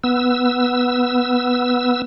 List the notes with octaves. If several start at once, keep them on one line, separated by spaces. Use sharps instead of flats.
B3 E6